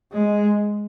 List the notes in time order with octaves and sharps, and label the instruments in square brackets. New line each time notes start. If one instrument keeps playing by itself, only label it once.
[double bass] G#3